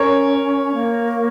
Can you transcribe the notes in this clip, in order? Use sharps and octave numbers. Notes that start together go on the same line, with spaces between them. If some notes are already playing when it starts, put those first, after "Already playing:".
Already playing: C#4 A#4 C#5
A#3